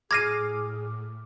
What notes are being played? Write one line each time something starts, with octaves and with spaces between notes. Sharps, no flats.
A2 G#4 D6 F6 G#6 A#6 C7 D#7